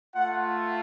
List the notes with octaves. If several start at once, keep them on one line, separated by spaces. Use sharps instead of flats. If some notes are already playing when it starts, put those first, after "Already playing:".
A3 F4 F#5